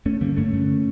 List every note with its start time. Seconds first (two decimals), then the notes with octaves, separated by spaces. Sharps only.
0.05 G2 A3 C#4
0.21 D3 G3 A#3
0.36 G2 A3 C#4
0.53 D3